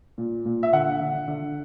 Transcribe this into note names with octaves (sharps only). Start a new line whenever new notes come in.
A#2
A#2
E5
D3 F#5
D3
D3